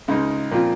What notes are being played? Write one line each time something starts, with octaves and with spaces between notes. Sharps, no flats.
C#2 C#3 G#3 D#4
A#2 F3 C4 F4